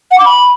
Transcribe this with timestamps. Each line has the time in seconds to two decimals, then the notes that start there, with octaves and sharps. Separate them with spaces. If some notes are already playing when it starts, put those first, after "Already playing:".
0.11 F#5
0.18 D6
0.25 B5